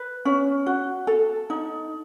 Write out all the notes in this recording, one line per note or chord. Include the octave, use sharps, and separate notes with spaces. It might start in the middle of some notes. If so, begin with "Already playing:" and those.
Already playing: B4
C#4
F#4
A4
D#4